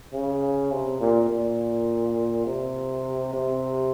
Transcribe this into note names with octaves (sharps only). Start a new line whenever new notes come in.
C#3
C3
A#2
A#2
C3
C3